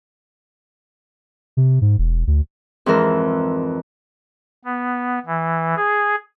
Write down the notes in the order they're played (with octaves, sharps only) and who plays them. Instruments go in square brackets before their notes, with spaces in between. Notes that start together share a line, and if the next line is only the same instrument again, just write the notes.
[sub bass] C3
G#2
E1
D2
[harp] F2 G#2 E3 A#4
[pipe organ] B3
E3
G#4